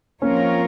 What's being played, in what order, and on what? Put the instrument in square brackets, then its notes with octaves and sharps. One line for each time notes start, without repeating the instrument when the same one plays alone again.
[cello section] F3 C4 F4 A#4 C#5 [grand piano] A#3 C#4